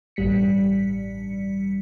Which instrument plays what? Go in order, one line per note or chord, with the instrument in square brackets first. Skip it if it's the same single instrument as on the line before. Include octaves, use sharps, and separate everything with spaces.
[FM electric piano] A1 G2 G3 B6 C#7